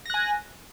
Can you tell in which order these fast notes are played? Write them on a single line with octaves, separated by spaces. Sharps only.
A#6 F#6 G#5